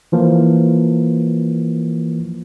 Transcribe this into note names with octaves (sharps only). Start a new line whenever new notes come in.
E3 F3 A#3